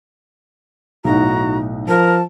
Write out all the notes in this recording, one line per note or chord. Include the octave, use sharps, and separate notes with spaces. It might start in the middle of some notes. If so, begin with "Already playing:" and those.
B1 A2 D#4 F#4 A#5
F3 A#4 A5